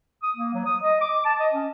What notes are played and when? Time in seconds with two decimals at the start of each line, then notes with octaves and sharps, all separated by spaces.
0.23 D#6
0.36 A#3
0.54 F#3
0.65 D#6
0.83 D#5
1.01 D6
1.25 A5
1.40 D#5
1.53 C#4